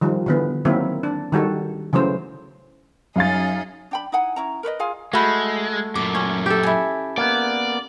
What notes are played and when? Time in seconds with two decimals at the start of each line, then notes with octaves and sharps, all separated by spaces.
0.01 D#3 F3 G3
0.26 D3 E3 B3
0.65 D#3 F#3 A#3 C4 E4
1.03 D4
1.32 D#3 G3 F#4 A4
1.93 C#3 E3 F#3 A3 C5
3.16 F#2 F#3 D#4 G#4 F5 A6
3.91 D4 G5 B5
4.12 D#4 E4 F#5 G#5
4.36 C#4 E4 A#5
4.63 A#4 B4 C#5 D#5
4.79 F4 G#4 F5 G#5
5.13 G#3 A3 F#4 B5
5.95 F#2 A#2 D6
6.15 C#4
6.46 G4 A4
6.63 E4 G#5
7.18 A#3 B3 D5